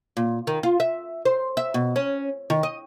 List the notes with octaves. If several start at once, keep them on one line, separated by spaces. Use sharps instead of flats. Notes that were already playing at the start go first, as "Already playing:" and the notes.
A#2
D#3
F4
E5
C5
E5
B2
C#4
D#3
D#5